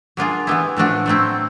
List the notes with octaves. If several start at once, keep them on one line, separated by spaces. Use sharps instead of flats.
F#3 A#3 D4 F4 G#4
E3 G3 B3 E4
A2 F3 A3 D4 F#4
F#3 A3 C4 E4